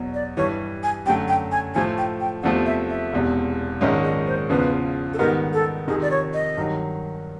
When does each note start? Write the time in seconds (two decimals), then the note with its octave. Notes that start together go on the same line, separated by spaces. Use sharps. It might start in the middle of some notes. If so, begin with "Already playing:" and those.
Already playing: E2 B2 F#3
0.14 D5
0.37 G2 E3 G3 C#5
0.83 G#5
1.06 F#2 D3 F#3 A3 G5
1.28 G5
1.52 G#5
1.74 A2 F3 A3 G#5
1.98 G5
2.20 G5
2.43 E2 C3 F3 A3 F#5
2.66 E5
2.90 E5
3.13 E1 E2 C3
3.81 A#1 G#2 D#3 G#3 C#4 E5
4.04 D#5
4.27 C5
4.49 E2 C#3 F3 B4
5.13 A4
5.19 G#2 D#3 G3 B3 A#4
5.53 A4
5.87 F2 C3 D#3 G#4
6.02 D5
6.11 C#5
6.33 D#5
6.57 G2 D#3 F#3